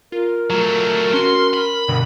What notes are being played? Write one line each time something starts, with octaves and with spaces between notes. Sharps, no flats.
F4 A#4
F#3 A3
C#4 F#4 C6
B5
G2 B2 D3